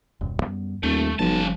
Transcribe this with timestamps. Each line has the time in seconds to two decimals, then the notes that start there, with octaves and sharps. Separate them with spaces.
0.21 D#1 F#2 B2
0.40 F#2 G3 B3
0.83 D#1 D#2 A3
1.19 F#1 B1 C#3 F3 G3 A5